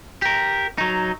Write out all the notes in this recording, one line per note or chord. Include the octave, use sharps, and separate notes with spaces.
G4 A#4
F#3 D#4